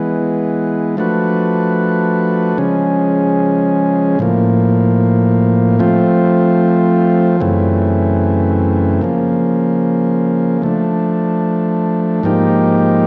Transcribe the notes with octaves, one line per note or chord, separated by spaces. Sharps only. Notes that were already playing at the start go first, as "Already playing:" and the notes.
Already playing: E3 G#3 B3
F3 A3 D4 F#4 B4
C#3 F3 G#3 C#4
A2 F3 A#3
F3 A3 C4 F4
F#2 C#3 E3 A3 C4
C#3 F3 A#3
F3 A3 D4
G#2 F3 A#3 D#4 G4